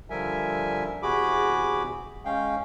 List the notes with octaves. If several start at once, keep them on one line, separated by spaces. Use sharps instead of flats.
D3 F3 G3 A#4 E5 G#5
E2 C3 F#4 G#4 B5 D6
G#3 C#4 F5 G5